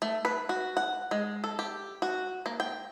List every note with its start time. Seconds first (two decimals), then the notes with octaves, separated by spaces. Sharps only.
0.02 A3
0.25 B4
0.49 F#4
0.77 F#5
1.11 G#3
1.44 A4
1.59 G4
2.02 F#4
2.46 A#3
2.60 G5